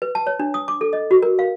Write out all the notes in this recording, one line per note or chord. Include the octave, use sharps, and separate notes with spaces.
B4
A5
C#5
D4
D#6
D6
A4
D#5
F#4
A#4
F5